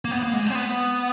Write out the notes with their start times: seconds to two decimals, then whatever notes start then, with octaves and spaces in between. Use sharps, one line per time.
0.05 A#3
0.11 B3
0.23 A#3
0.33 G#3
0.45 A3
0.50 C4
0.55 B3